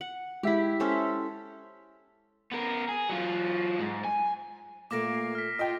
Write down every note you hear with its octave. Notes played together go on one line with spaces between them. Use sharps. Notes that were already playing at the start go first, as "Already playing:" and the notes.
F#5
G#3 E4 G4 E5 B6
C#4 A4 C5
B3 A#4
G#4
F#3 F4
G#2
G#5
A#2 A3 A#3 D6 A#6 D7
C7
F6 B6
F4 D#5 G5